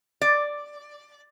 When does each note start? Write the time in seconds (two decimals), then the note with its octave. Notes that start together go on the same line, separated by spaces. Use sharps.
0.21 D5